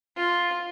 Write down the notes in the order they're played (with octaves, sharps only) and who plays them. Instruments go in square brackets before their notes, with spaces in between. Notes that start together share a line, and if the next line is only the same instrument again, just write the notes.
[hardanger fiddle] F4